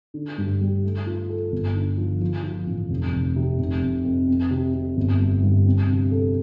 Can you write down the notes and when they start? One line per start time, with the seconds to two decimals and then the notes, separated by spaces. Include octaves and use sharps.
0.14 D3
0.38 G2
0.61 G3
0.84 A3
1.07 F4
1.29 A4
1.52 G1
1.75 D3
1.98 F3
2.21 F3
2.44 F3
2.67 A1
2.90 F1
3.13 F1
3.36 C3
3.59 F1
3.83 F1
4.05 F2
4.27 C4
4.51 C3
4.74 C3
4.97 G1
5.20 G3
5.43 G2
5.66 C4
5.88 C3
6.11 A4